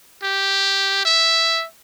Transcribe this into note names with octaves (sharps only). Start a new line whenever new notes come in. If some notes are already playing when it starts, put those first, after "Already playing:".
G4
E5